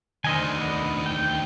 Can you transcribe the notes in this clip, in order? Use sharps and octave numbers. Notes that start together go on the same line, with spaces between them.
D2 D#3 C5 D#5 G#5
D3 B3 D#5
G5